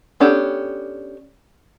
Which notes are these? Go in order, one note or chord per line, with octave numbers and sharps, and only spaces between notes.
B3 C#4 D4 G4 A4